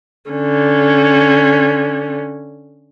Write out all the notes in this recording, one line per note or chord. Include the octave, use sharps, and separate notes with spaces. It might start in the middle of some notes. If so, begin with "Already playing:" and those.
D3 C#4